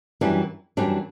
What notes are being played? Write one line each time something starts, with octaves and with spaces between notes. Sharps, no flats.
F#2 E3 G3 D4
F#2 E3 G3 D4